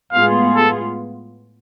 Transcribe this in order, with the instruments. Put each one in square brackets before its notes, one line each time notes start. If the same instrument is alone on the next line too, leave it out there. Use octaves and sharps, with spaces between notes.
[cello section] A2 G#3 B3 F4 G#4 [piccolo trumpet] F5
[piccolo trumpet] A4